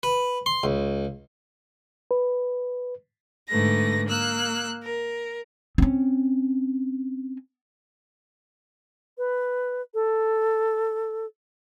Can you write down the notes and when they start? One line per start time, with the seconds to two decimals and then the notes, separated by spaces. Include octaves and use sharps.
0.03 B4
0.46 C6
0.64 C#2
2.11 B4
3.48 G#2 D3 A3 B4 A#6
4.06 A#3 E6 F#6
4.82 A#4
5.78 C4 C#4
9.18 B4
9.94 A4